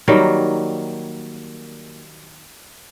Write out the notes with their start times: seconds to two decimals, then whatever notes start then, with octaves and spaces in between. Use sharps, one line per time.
0.08 D#3 F#3 G3 A#3